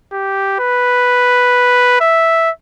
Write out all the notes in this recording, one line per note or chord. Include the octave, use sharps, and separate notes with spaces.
G4
B4
E5